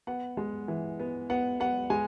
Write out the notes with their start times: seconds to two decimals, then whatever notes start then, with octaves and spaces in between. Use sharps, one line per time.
0.07 B3 F#5
0.37 G#3
0.68 E3
1.00 B3
1.30 B3 F#5
1.60 B3 F#5
1.90 G#3 G#5